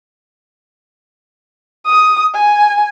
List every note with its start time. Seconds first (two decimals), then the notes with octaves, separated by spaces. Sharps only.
1.86 D#6
2.34 G#5